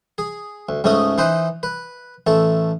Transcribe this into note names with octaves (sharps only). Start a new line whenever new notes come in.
G#4
D2
C#2 G#2 A3 C#4 D#5 D#6
E3 D#4 B4 C5
B4
A1 A3 A4